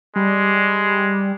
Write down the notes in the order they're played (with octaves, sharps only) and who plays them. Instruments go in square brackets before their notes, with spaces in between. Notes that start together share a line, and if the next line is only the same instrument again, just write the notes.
[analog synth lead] G3 [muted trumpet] G#3